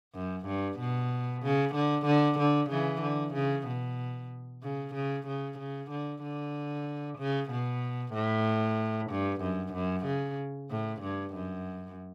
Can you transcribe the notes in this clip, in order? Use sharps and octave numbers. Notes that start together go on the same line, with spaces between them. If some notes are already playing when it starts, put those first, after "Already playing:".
F#2
G2
B2
C#3
D3
D3
D3
C#3 E3
D3
C#3
B2
C#3
C#3
C#3
C#3
D3
D3
C#3
B2
A2
G2
F#2
F#2
C#3
A2
G2
F#2